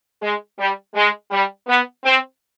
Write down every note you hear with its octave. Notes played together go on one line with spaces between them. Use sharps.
G#3
G3
G#3
G3
B3
C4